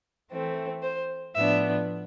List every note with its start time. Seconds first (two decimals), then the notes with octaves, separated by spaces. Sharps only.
0.31 E3 A3 C4
0.83 C5
1.35 A2 F3 B3 D4 E5